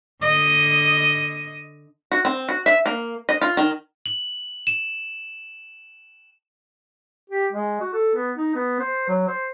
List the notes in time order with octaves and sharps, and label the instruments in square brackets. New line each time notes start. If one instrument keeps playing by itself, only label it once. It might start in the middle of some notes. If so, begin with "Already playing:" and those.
[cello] D3 D#5
[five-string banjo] F#4
C4
F#4
E5
A#3
D#5
F4
D#3
[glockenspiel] F#7
E7
[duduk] G4
G#3
F#4
A4
B3
D#4
B3
C5
F#3
C5